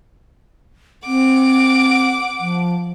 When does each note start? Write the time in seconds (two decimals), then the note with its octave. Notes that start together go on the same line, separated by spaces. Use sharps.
1.06 C4 F#5 D6
2.40 F3